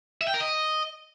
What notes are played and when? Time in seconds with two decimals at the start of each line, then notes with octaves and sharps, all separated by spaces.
0.21 E5
0.27 G5
0.34 A#4
0.40 D#5